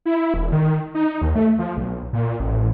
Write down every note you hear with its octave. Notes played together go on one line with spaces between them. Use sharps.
E4
E1
D#3
D#4
D#2
A3
F3
B1
A#2
A1